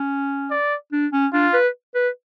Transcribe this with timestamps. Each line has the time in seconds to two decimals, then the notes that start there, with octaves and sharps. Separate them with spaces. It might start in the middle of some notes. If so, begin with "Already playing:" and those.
Already playing: C#4
0.51 D5
0.92 D4
1.12 C#4
1.33 D4 F4
1.53 B4
1.94 B4